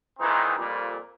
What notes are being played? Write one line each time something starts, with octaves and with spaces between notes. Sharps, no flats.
A#2 D#3 E3 G#3 C4 D#4
F2 A#2 G3